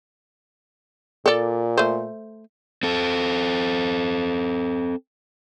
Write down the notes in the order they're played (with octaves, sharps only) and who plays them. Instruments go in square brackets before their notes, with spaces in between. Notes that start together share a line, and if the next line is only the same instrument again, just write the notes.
[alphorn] A#2 [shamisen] A4 D5
[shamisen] A3 C5
[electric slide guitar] C4 A4